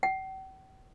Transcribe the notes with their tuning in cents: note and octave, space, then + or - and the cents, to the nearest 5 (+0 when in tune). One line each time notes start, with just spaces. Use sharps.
G5 -45